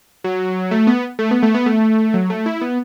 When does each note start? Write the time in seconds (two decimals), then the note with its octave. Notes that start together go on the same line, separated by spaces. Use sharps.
0.24 F#3
0.71 A3
0.87 B3
1.19 A3
1.31 B3
1.43 A3
1.54 B3
1.66 A3
2.14 F#3
2.30 A3
2.46 E4
2.61 B3